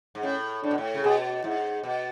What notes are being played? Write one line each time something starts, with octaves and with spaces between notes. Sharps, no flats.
G#2
A2 C#4
A2 D4
B2
A2
C#3
B2 G#4
G#2 E4
B2